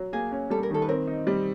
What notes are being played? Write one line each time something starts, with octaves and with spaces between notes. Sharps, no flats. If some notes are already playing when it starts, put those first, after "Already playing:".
Already playing: F#3
A#3 G#4
C#4
G3 A4
A#4
D#3 A4
B4
C4 A#4
D#4
G3